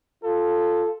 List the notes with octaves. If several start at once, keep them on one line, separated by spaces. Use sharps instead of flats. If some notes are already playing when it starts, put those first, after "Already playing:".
F4 A4